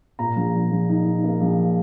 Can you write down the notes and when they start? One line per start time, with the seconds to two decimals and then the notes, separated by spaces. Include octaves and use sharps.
0.19 A#2 A#5
0.36 A#1
0.54 A#1
0.71 A#1
0.89 D#4
1.05 D#4
1.24 A#3
1.41 A#1